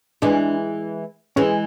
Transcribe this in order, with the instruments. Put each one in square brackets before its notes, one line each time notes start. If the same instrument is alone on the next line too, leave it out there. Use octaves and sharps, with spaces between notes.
[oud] E3 G#3 [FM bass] D4
[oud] E3 G#3 [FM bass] C#4